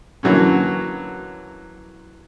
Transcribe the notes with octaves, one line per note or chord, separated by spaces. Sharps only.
D3 E3 F#3 A#3 C#4